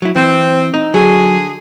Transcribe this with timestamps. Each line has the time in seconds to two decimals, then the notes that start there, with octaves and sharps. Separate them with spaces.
0.02 F#3 E4
0.16 E3 C4
0.74 D#4
0.94 D3 F#3 G#4